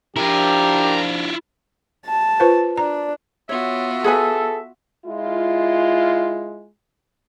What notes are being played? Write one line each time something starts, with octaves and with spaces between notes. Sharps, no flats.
F3 D4 E4 F4 G4 A#4
A5
F4 B4 C5
D4 A#5
B3 F4 F#4 C#5 E5
G#4 A4 B4 G#5
G#3 E4 F4